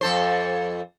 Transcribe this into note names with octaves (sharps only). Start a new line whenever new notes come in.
F2 A4 C5